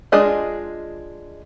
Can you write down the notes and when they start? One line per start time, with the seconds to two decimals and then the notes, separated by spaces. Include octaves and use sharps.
0.12 G#3 D4 F4 G#4 D#5